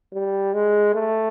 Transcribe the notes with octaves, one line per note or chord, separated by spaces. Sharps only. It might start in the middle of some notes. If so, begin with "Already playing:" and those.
G3
G#3
A3